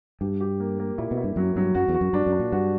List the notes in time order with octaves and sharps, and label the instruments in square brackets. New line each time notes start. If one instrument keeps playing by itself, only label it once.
[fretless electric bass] G2 [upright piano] G4
[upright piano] G4
A#3
A#3
[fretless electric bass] A#2 [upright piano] E4
[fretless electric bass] B2
[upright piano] E4
[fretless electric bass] G2
[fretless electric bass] F#2 [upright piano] F#3
[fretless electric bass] G2 [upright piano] F#3
[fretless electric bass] F#2 [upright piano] F#4
[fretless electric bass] E2
[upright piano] F#4
[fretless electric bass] F#2
[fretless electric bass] G2 [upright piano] D4
[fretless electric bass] F#2
[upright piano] D4
[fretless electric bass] A#2
[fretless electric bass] G2 [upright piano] F#4